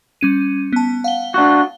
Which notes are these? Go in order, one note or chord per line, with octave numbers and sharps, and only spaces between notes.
G3 C#4 D#7
B3 A5
F5 F#5 G7
D4 F#4